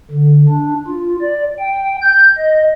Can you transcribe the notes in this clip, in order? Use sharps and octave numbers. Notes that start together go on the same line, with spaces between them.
D3
D4
F4
D5
G5
G6
D#5